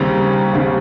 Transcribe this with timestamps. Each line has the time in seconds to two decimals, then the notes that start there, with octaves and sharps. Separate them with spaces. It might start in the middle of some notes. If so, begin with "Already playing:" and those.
Already playing: D#2 C#3 G3 C4 A#5
0.53 D#2 C#3 G3 C4